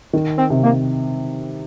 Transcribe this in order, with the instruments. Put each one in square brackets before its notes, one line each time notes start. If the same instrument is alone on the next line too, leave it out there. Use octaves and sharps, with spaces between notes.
[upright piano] D#3
[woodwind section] C4
[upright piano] C3
[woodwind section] A#3